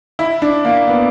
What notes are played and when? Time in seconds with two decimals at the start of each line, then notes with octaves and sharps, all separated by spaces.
0.19 E4
0.42 D4
0.65 A#3
0.88 B3